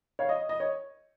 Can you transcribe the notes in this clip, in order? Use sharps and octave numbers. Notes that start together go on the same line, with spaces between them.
C#5 F5
D#5
D#5
C#5